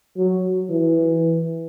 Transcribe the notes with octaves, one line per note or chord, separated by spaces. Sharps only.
F#3
E3